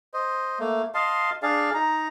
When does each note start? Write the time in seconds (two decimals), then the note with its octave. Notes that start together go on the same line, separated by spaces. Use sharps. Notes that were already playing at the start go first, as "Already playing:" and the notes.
0.14 C5 D#5
0.60 A3 A#3
0.94 D#5 F5 A5 C6
1.43 D4 G#4 D5 F5
1.74 D#4 A#5